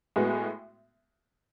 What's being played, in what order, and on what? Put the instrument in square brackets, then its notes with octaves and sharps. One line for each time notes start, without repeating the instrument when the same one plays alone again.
[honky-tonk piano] A2 G#3 B3 F#4